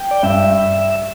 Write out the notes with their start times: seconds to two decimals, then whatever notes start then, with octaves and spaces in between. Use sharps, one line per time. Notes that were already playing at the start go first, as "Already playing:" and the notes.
Already playing: G5
0.11 D5
0.23 G2 E5